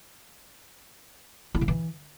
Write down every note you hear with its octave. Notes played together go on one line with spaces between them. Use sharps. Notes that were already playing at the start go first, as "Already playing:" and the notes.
E4
C#3
E3